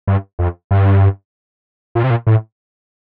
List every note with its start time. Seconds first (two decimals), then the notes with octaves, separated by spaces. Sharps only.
0.07 G2
0.39 F2
0.71 G2
1.95 A#2
2.04 C3
2.10 A#2
2.27 A2